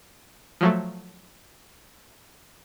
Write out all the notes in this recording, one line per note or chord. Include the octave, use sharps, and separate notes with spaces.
F3 F#3 A3